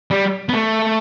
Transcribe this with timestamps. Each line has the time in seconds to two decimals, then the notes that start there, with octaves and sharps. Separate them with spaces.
0.11 G3
0.49 B3
0.54 A3